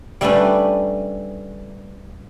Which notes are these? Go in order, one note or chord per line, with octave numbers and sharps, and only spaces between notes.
G3 A3 C#4 D4 B4